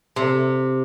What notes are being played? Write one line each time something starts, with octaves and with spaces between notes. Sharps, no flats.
C3